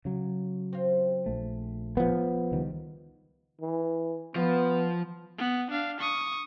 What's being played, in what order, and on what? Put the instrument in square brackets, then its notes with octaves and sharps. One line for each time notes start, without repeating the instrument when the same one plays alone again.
[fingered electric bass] C#3 F#3
[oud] C4 F4
[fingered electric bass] A#1 A3
[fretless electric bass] F3 B3
[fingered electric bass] C#2 D#3 G3
[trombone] E3
[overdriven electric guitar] F3 [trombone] B3
[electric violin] B3
D4 F5
C#6 D#6